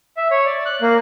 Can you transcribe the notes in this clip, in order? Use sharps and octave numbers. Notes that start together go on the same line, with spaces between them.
E5
C#5
D5
F#6
A#3